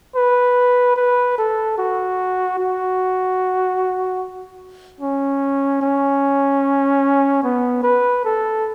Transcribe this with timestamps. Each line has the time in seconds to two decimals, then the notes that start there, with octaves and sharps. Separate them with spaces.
0.16 B4
0.96 B4
1.38 A4
1.78 F#4
2.59 F#4
5.01 C#4
5.82 C#4
7.43 B3
7.83 B4
8.25 A4